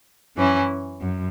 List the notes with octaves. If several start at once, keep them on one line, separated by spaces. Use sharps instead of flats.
F#2 E3 C#4 E4
F#2